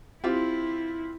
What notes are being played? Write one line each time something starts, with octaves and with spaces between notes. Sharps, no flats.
C4 E4 F4 G4